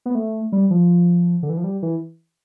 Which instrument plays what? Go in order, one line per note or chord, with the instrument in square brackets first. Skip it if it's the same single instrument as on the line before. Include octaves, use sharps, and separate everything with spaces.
[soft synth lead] B3
A3
G3
F3
D3
E3
F3
G3
E3